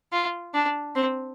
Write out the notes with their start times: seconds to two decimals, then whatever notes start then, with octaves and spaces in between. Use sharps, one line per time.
0.12 F4
0.54 D4
0.95 C4